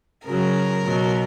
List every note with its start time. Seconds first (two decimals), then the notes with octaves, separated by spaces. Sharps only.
0.26 C#3 F#3 A#4
0.84 B2 F#3